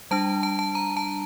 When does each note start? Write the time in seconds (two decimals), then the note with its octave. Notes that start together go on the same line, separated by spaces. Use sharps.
0.11 G3 D4 A5
0.43 A5
0.59 A5
0.75 A#5
0.97 A5